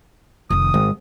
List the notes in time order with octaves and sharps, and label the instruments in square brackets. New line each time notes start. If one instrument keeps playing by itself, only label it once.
[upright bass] F1 D#3 [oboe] D#6
[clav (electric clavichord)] G#1 [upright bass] G#3